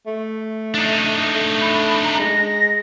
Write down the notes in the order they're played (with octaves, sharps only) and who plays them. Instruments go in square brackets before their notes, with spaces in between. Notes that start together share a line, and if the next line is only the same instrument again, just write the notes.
[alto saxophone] A3
[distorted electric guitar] D4 D#4
[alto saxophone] A3
[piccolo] B5
A#5
[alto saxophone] G#3 [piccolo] A#6